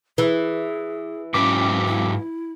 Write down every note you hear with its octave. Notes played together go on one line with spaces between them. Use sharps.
E3 G#4
G#2 F#3 C#4 B4 D6
E4